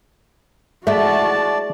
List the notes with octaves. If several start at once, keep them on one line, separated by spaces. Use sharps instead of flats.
G#3 A3 E4 F#4 D5 A5